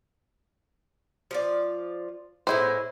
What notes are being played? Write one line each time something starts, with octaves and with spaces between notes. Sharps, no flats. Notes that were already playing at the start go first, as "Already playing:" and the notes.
F3 F4 D5
A2 G#3 B3 E4 C5